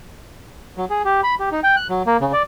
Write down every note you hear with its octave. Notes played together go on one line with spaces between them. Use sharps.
F#3
G#4
G4
B5
G4
D#4
G5
F#6
F#3
A#3
C#3
D5